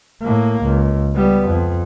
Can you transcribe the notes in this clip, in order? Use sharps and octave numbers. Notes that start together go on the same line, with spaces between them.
A2 A#3
C#2
G3 B3
F2